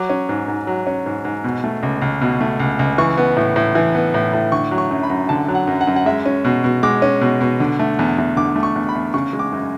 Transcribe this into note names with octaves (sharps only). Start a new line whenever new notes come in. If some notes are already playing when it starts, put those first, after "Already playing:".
Already playing: F#3 D6
C#4
G#2
G#2
F#3
C#4
G#2
G#2
B2
A3
C#2
C#2
B2
A3
C#2
C#2
E3 C#6
B3
A2
A2
E3
B3
A2
A2
D3 C#6
F#3
C#6
F#2
B5
F#2
D3 A5
F#3
F#5
F#2
F#5
F#2
F#5
G#3 E5
C#4
B2
B2
G#3 D6
C#4
B2
B2
D3
A3
E2
E2
D3 D6
A3
C#6
E2
B5
E2
C#3 C#6
G#3
D6
F#2